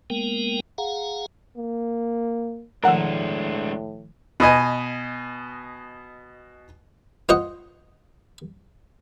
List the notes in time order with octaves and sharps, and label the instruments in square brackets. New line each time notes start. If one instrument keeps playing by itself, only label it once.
[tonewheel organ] G#3 A#3 B3 A#4 G5
G#4 F5 F#5 A#5
[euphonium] A#3
[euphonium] A2 [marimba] D#3 F3 A3 [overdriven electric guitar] G#3 D4 [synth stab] A#4 F#5
[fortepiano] B2 B4 D#5 G#5
[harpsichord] F4 C5 D#5 F#5